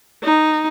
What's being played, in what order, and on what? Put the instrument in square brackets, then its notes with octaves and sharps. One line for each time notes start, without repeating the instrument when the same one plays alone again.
[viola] D#4